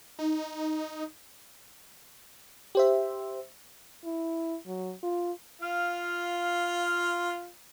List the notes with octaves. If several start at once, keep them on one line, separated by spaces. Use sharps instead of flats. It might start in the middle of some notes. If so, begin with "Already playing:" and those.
D#4
G4 C5 E5
E4
F#3
F4
F4 F5